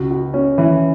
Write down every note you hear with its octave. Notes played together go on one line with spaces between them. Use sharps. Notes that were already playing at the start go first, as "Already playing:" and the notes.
Already playing: C#2 F#4
F#4
C#4
E3